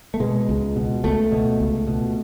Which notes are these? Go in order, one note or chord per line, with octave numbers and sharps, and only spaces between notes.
A3
B2 G#3
C#2
B2
C#2 A3
B2
C#2
B2